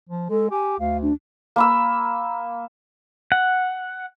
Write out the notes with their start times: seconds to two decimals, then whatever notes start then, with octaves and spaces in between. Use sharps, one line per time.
0.09 F3
0.30 G#3 A4
0.51 G4 G#5
0.79 D2 F5
1.02 D4
1.56 A#3 B5 E6
3.32 F#5